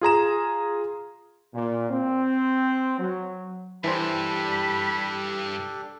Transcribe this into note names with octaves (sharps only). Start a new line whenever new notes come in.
F4 G#4 A#5 E7
A#2
C4
F#3
G2 E3 D4 G4 A4 C5 B5